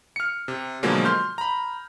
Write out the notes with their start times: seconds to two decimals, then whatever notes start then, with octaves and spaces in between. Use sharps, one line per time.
0.16 F6 C#7
0.48 C3
0.83 B2 D3 F3 F#3 G#3 A#3
1.05 C6 F6 G6
1.38 A#5 B5